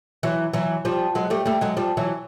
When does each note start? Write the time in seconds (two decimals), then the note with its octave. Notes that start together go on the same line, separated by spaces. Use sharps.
0.23 E3 F#3
0.53 E3 F#3
0.85 F3 G3
1.15 F#3 G#3
1.30 G3 A3
1.46 G3 A3
1.61 F#3 G#3
1.77 F3 G3
1.97 E3 F#3